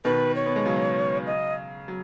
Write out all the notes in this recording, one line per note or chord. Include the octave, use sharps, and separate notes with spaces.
B2 D#3 B4
C#5
B3
G#3
C#3 F#3
D#5
F#3